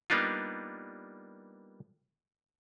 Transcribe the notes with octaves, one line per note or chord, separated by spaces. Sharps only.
G3 A#3 B3 D4 D#4 F4